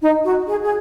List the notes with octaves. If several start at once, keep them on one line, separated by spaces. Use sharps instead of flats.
D#4
F#4
G#4
G#4